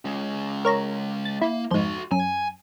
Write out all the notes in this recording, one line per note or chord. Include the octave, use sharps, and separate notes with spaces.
G#3 C#4
A#4 C#5 A#5
A6
A#3 E4
F2 G#2 F#4 C6
F#2 G#5